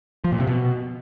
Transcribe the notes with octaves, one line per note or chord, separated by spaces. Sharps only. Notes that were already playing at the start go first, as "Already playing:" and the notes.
F3
A#2
C3
B2